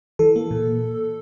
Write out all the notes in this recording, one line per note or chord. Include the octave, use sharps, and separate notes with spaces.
E3 A4
A#3
A#2